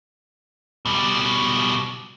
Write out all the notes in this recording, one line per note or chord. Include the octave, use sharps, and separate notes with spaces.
B2 G3